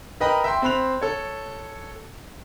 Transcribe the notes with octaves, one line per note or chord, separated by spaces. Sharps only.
A#4 B4 D#5 G5 A#5 B5
E5 G5 C6
C4 C5 B5 F#6 F7
A4 C#5